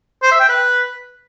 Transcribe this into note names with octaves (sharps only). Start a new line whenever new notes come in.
C5
E5
G5
B4